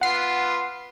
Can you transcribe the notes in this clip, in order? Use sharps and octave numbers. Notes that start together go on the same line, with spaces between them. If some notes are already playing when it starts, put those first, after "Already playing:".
B3 F4 F#5 C7